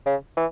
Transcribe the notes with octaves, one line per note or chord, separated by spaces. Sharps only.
C#3
E3